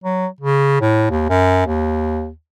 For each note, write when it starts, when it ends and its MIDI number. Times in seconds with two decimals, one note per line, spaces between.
0.04 0.27 54
0.41 0.80 49
0.81 1.07 45
1.11 1.27 39
1.29 1.66 42
1.67 2.30 39